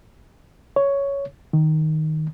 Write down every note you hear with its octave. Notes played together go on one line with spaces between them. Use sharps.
C#5
D#3